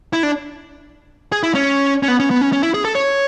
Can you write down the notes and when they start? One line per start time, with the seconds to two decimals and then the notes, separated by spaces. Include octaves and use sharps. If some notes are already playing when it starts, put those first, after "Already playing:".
0.13 E4
0.23 D4
1.32 G#4
1.43 E4
1.55 C#4
2.03 C#4
2.08 B3
2.20 C#4
2.31 B3
2.41 C#4
2.53 C#4
2.63 E4
2.74 G#4
2.85 A4
2.95 C#5